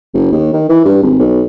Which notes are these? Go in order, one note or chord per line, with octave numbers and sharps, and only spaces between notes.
F#1
D#2
D#3
E3
G2
G#1
B1